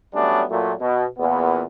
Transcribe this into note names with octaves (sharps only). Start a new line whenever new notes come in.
F#3 G3 A3 B3 C#4 D4
A#2 F#3 A3
B2
E2 A#2 B3